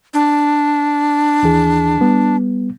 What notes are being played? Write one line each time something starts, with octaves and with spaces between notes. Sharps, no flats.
D4
D#2 E3 G#4
G3 B3